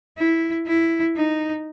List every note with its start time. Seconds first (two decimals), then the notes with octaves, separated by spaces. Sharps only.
0.18 E4
0.67 E4
1.17 D#4